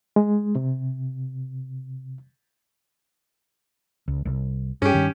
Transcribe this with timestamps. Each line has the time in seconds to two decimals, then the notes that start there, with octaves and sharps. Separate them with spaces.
0.16 G#3
0.55 C3
4.08 C#2
4.25 C2
4.82 G2 C#4 G4
4.94 G2 D#3